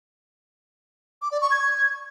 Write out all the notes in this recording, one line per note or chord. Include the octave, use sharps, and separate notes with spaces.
D6
D5
C#6
G#6